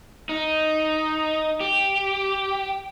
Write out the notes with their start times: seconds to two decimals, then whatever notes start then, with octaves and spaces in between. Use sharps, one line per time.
0.29 D#4
1.61 G4